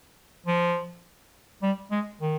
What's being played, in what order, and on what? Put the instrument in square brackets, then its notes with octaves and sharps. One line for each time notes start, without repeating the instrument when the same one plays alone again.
[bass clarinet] F3
G3
G#3
D#3